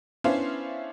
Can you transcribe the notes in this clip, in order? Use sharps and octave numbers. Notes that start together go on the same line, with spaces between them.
B3 C#4 D4 E4 C5 F5